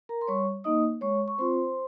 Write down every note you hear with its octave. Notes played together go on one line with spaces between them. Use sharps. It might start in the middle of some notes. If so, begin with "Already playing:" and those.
A#4 A#5
C6
G3 C#5 C#6
A#3 D#4 D#5 D#6
G#3 C#5 C#6
C#6
C4 F4 C5 C6